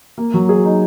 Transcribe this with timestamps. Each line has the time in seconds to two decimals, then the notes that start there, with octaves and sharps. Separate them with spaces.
0.18 A#3
0.34 F#3
0.49 G#4
0.65 D#4